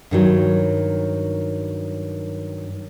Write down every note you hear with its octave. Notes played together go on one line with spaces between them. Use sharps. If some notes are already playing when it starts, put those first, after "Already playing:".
G2 D#3 F#3